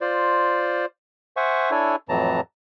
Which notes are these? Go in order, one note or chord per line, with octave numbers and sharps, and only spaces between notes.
F4 C5 D5
C5 E5 F#5 G#5 C#6
D4 E4 A4 C#5 G#5
F2 A2 E3 F#3 A5 A#5